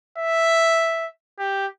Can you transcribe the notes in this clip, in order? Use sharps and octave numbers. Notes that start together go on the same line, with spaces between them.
E5
G4